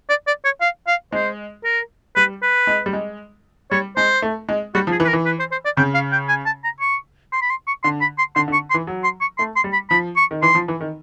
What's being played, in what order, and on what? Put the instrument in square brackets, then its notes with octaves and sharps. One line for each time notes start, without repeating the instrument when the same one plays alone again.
[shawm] D5
D5
C#5
F5
F5
[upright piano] G#3 [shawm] C5
[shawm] A#4
[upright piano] G3 [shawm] B4
[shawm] B4
[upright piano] G#3
G3
G#3
[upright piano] G3 [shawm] C#5
[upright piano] G#3 [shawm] C5
[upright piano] A3
G#3
[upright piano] G3 [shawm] F#4
[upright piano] F3
[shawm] G#4
[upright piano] E3
[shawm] B4
A#4
[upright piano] E3
[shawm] B4
C5
C5
D5
[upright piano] C#3 [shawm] G5
[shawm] F5
G5
G#5
A5
A#5
C#6
C6
B5
C6
C#6
[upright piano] D3 [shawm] C6
[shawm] B5
C6
[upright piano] D3 [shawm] C6
[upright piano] D3
[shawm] C#6
C6
[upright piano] E3
F#3
[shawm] C6
C#6
[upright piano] A3 [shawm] C6
[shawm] C6
[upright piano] G3
[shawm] B5
[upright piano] F3 [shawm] B5
[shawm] C#6
[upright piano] D#3
[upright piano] E3 [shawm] C6
[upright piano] F3
E3
D#3